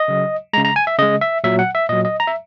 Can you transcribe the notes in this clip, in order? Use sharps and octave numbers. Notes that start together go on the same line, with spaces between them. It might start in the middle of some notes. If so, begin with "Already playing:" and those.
Already playing: D#5
C#3 F#3
C#3 G#3 A#5
A#5
G#5
E5
C#3 G#3 D#5
E5
A#2 F#3 E5
F#5
E5
A#2 F#3 D#5
D#5
A#5
E5